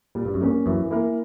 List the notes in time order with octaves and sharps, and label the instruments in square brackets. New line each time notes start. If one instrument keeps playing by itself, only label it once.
[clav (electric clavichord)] A#2 [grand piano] G3
[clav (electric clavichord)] G2
F#2
[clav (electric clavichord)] G2 [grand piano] A#3 C#4
[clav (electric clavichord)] F#2 [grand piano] E3
[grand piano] A#3 E4 A#4